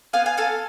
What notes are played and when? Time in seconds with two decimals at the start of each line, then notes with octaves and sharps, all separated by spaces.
0.13 B3 F5 G#5
0.26 F5 G#5
0.37 A4 F5 G#5